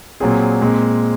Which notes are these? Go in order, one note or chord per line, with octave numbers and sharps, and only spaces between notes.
A#2 F#3 C4 G#4
A#2 G#3 C4